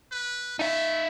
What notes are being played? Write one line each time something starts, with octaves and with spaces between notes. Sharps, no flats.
B4
A3 D#4 E5